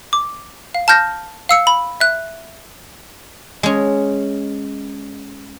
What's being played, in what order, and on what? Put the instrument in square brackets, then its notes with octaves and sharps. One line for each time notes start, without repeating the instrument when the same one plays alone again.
[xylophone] D6
F5
A5 F6 G6 A#6
F5 E6 C#7
B5
E5 F#6
[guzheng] G#3 C#4